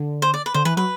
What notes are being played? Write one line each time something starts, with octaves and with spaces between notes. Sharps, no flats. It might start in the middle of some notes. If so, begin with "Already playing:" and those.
Already playing: D3
C5
D5
B4
D3 C5
E3 B4
F#3 B4